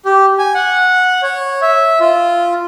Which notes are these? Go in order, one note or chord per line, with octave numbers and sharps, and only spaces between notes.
G4
G#5
F#5
C#5
E5
F4